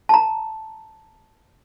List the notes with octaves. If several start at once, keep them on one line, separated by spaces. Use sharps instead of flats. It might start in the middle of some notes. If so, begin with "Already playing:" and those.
A5 A#5